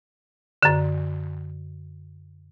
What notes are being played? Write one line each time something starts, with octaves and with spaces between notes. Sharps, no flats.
F#2 D3